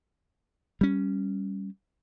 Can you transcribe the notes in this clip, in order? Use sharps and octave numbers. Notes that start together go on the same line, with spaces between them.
G3 C#4